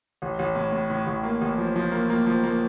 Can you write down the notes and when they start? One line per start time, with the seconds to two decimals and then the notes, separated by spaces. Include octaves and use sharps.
0.22 A1
0.39 A1
0.56 A2
0.73 A2
0.90 A2
1.07 A1
1.23 A#3
1.41 A1
1.58 F3
1.76 F3
1.92 A#3
2.10 A#3
2.26 F3
2.44 A#3